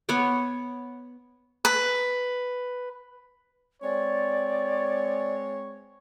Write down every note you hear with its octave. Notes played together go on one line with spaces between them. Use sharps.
B3 C#5 F#5 D6
B4
G#3 C4 C#5 D5